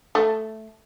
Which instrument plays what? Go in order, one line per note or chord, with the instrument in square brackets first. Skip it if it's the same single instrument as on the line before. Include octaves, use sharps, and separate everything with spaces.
[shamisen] A3